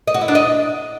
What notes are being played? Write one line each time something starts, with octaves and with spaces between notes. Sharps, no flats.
D#5
F#4
E4
D4
D#5